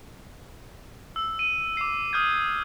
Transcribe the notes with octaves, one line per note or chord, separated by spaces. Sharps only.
E6
D#7
D6 C7
D#6 F6 G6 G#6